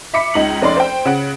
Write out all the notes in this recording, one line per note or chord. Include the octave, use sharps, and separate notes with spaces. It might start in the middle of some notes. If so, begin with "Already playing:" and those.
E5 B5 D6 B6 C#7
C#2 D#4 F#7
F1 C#4 D#4 D5 C6
C5 G5
C#3 F#5 D7